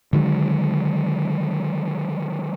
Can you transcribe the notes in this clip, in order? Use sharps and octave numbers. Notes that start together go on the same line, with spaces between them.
D3 D#3 F#3 G#3